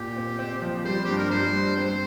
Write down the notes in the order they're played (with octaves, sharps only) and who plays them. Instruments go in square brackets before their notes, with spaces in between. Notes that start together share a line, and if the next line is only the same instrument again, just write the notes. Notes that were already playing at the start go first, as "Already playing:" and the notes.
Already playing: [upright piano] A#2 [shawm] G4
[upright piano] C4
C4
F3
[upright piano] G3 [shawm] C5
[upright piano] G2 [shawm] G4
[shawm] A#4
[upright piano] G3 [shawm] C5
[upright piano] G2
[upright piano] C4 [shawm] C5